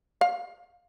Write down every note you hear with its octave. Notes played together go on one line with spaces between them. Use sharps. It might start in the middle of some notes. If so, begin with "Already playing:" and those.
F5